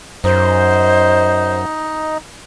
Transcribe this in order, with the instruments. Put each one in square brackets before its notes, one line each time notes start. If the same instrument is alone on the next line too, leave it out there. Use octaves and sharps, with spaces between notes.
[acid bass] F#2 [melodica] D#4 D#5 [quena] C5